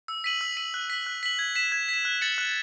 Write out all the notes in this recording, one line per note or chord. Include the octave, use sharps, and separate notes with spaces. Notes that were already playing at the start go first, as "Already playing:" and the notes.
E6
B6 D#7 F#7
E6
B6 D#7 F#7
F#6
B6 F#7
F#6
B6 F#7
G#6
B6 E7
G#6
B6
E7
F#6
A6 C#7 F#7
F#6